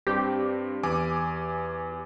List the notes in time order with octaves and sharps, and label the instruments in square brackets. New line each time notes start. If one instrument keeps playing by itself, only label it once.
[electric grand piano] G2 C4 [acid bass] G4
[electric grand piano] E2 G#5 D6